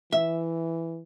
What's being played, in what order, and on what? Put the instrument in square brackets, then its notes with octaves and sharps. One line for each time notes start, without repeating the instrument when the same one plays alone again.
[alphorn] E3 [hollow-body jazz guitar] E5